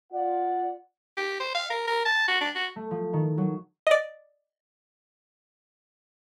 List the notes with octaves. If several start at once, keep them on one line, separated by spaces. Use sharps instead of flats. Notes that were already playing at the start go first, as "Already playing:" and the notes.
F4 D5 F#5
G4
C5
F5
A#4
A#4
A5
F#4
D4
F#4
A3
F3
D#3
F#3
D5 D#5